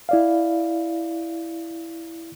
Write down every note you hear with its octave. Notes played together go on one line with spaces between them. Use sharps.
E4 D5 F5